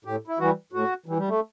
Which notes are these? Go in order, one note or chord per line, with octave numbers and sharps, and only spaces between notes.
A2 G4
E4
E3 G3 F#4
A2 F#4
E3 G3
G3
A3